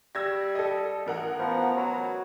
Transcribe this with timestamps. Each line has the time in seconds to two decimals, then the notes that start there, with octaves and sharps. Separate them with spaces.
0.15 G3 E6 G#6 A#6
0.55 A4 D#5
1.06 A1 A#4 F#5
1.39 F3 B3 A#5
1.77 F#3